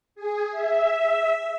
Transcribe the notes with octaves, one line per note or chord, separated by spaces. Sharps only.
G#4
E5